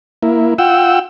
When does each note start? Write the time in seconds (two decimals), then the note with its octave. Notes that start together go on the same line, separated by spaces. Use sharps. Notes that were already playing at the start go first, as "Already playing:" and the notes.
0.23 A#3 E4
0.58 F4 F#5 G5 E6